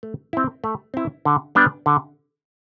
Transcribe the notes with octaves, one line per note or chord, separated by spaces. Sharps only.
A3
C4 E4
A3
C4 E4
D3
G3 B3 D4
D3